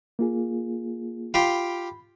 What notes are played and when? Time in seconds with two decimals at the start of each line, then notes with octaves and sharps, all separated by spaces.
0.19 A#3 F4 G#4
1.34 F4 G4 F5 B5